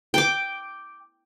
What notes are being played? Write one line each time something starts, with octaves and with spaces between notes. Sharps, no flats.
G5 D6